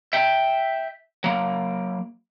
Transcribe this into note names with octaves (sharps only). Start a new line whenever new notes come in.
E5 G5
F#3 A#3